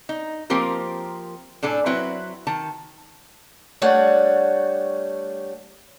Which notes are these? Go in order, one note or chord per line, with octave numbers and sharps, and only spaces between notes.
D#4
F3 A#3 C4 G4 A#4
A2 D4 A4 G#5
F#3 C4 E4 B4
D#3 A5
G3 A3 D4 C#5 F#5